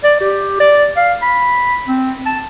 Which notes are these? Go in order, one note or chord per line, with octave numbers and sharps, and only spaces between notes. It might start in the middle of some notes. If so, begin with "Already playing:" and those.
D5
G4
D5
F5
B5
C4
A5